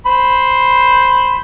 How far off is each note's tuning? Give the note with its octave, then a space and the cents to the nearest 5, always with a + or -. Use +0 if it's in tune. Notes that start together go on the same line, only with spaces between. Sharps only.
C5 +0 B5 +0